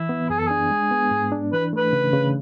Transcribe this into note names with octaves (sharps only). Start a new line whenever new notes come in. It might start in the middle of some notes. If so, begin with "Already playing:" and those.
Already playing: E3 E4
B3
F#2 G#4
A4
D4 G#4
G#3
B3
G#2
D4
E3 B4
A3 B4
C#3
C#3